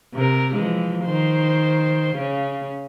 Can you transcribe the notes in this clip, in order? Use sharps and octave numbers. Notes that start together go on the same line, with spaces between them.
C3 A#4
E3 F3 G#3
D#3 C5
C#3 C#4